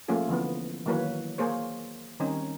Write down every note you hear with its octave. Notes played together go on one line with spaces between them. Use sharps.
F3 A3 A#3 C#4 F4 G#4
D3 E3 F3 B3
D#3 E3 F#3 A#3 B4 C#5
A#3 G#4 C5 C#5
D#3 G3 C4 C#4 D#4